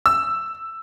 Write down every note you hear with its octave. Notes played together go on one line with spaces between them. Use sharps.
E6